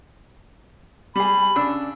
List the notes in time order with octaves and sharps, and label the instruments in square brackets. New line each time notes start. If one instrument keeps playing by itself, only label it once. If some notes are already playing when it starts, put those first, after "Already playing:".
[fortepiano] G3 G#4 [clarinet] B5
[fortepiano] C#3 D4 E6